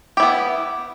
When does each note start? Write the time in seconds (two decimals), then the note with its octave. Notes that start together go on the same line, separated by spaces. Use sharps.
0.17 G4
0.20 E4
0.23 B3